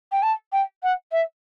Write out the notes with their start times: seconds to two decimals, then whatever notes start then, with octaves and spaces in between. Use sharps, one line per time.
0.11 G5
0.22 A5
0.52 G5
0.83 F#5
1.11 E5